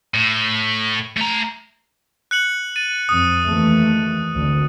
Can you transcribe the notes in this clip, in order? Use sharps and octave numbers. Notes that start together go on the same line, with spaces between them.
A2
A3 A#5
F#6 C#7 F#7
A6 D#7
F2 D#6
D#2 E3 A3
G#1 D2